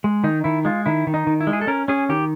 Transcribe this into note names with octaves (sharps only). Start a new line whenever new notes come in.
G#3
D#3 D#4
D#3 E4
G#3 F4
D#3 E4
D#3
D#4
D#3
E4
G#3
G#4
A4
C#4 A#4
C#4 G#4
D#3 G4